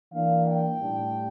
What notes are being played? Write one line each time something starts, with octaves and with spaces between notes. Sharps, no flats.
E3 A#3 D4 F5
G5
A2 G3 D4